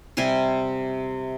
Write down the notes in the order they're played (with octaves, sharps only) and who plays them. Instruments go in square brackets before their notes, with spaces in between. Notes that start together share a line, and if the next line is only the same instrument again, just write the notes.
[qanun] C3 G3 G#5 C6